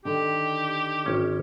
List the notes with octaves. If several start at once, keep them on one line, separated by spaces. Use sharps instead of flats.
D3 D#3 G4
G#1 C#4